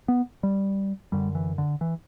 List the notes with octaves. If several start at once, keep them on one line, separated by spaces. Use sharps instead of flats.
B3
G3
F#2 D3 G3
E3
D3
E3